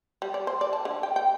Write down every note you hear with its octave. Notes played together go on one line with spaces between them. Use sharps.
G3
D5
C5
D5
A5
D3
G5
G5